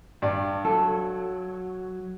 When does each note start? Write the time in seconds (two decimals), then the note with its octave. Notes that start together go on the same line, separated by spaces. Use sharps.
0.22 G2 D5
0.65 F#3 A4